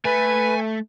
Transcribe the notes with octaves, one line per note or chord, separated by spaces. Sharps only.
A3 B4 G#5